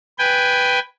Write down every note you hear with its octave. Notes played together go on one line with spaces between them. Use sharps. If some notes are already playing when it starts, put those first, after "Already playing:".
B4 G5 G#5